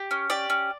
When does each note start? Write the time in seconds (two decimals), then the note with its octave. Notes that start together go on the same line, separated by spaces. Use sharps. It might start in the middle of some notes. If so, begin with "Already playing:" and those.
Already playing: G4
0.11 C#4
0.30 G4 D5
0.50 C#4